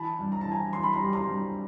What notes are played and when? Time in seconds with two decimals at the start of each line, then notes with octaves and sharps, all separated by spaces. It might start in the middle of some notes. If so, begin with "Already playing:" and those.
Already playing: E3 A5 B5
0.19 G2
0.32 A#5
0.41 A5
0.46 E3
0.51 G#5 A#5
0.73 E3 C6
0.83 B5
0.93 A#5 C6
1.00 G3
1.13 A#5 C6
1.26 G2